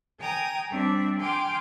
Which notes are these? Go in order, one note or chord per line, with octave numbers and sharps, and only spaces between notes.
G5 G#5 A#5 D#6
G3 C4 D4 E5
G5 G#5 C6 D6 F6